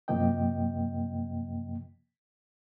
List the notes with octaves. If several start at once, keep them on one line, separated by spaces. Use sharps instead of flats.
F#2 C3 F3 A#3 D#5 G5